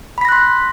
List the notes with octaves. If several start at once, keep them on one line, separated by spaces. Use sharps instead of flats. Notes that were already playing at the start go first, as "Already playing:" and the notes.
B5 C6 F#6 A#6 B6